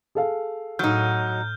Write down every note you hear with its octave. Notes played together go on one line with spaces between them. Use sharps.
G#4 A4 F5
A2 F#3 D#4 F6 G6